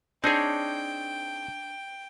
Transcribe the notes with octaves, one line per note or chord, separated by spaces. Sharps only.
C4 D4 D#4 G#4 C#5 G5